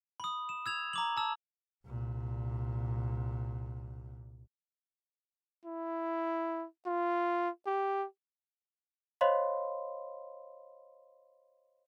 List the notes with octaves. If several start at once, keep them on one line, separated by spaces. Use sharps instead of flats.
B5 D#6
E7
E6 G#6 F7
A#5 D6 F#7
A5 E6
C2 A#2
E4
F4
G4
C5 C#5 D#5 F5 B5 C6